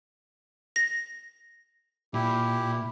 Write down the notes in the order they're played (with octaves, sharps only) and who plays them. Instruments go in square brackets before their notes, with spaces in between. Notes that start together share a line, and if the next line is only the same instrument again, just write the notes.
[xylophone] A#6
[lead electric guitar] A#2 [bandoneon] E4 G4